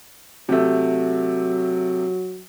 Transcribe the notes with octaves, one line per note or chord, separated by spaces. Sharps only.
C3 F#3 A3